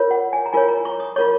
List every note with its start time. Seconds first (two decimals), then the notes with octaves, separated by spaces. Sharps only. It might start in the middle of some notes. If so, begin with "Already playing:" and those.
Already playing: F4 A#4 C#5
0.11 F#5
0.33 G#5
0.46 A#5
0.53 F4 A#4 C#5 G#5
0.68 A#5
0.85 C#6
1.00 D#6
1.16 F4 A#4 C#5 C#6